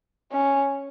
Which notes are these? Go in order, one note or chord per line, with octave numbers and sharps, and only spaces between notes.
C#4